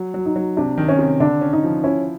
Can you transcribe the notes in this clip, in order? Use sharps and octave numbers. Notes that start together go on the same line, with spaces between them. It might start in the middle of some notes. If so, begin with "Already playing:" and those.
Already playing: F#3
F#3
D#4
F#3
C3 D4
D#3
C#4
C3
D3 D4
C#4
D#4
F3
C#4 E4